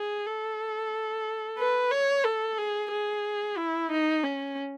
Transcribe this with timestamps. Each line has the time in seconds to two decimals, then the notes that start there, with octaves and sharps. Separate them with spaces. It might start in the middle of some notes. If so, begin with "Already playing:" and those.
Already playing: G#4
0.26 A4
1.58 B4
1.91 C#5
2.24 A4
2.58 G#4
2.91 G#4
3.57 E4
3.91 D#4
4.23 C#4